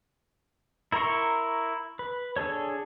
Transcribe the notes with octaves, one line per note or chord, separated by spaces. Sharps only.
E4 A#4 A#5 C6 C#6
B4
D4 G#4 A4 C#5